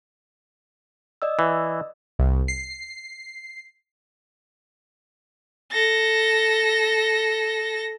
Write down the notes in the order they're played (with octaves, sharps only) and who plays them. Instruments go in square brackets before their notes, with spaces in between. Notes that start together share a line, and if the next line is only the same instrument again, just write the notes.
[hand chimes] D5 D#5 E6
[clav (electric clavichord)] E3
[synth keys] C2
C7
[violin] A4 A#6